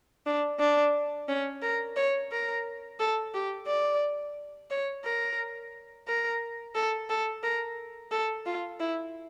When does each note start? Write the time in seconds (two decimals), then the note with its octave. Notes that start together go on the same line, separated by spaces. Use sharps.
0.26 D4
0.60 D4
1.29 C#4
1.62 A#4
1.97 C#5
2.31 A#4
3.00 A4
3.34 G4
3.67 D5
4.71 C#5
5.05 A#4
6.08 A#4
6.75 A4
7.10 A4
7.43 A#4
8.11 A4
8.46 F4
8.80 E4